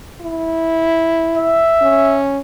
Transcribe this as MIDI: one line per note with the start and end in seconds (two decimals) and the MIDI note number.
0.21 1.63 64
1.37 2.21 76
1.81 2.39 61